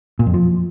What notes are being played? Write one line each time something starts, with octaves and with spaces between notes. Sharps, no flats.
A#2
F2
F3